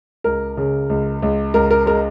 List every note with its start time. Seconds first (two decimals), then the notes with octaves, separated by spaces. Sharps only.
0.24 C#2 A#4
0.57 C#3
0.90 C#2
1.22 C#2
1.54 C#2 A#4
1.71 A#4
1.86 G#3 A#4